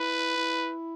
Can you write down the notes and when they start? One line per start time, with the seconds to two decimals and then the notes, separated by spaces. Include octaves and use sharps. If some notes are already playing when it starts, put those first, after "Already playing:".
Already playing: E4 B4
0.37 E4